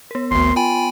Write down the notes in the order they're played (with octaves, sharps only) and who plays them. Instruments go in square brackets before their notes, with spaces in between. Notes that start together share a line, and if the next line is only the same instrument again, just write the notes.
[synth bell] B3 A#4
[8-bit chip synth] G#1 D2 [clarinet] C6
[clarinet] F4 [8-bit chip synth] G5 G#5 B5